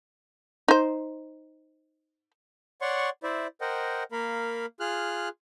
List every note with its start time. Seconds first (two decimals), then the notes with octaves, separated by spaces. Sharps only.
0.68 D#4 C5
2.81 C#5 D5 F#5 C6 C#6
3.23 E4 C5 D5 E5
3.61 A#4 C5 D#5 F#5 G5
4.12 A#3 A#4 F5 B5
4.80 F4 G#4 F6 F#6